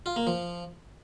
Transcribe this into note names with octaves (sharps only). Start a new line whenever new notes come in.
F4
A#3
F3